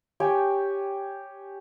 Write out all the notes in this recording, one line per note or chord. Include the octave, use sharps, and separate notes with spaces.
G4 C#5 G5 G#5